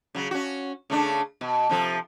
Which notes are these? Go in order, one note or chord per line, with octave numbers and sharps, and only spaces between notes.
C#3 F#3
C#4 F#4
C#3 A3 D4
B2
C3 F3 A4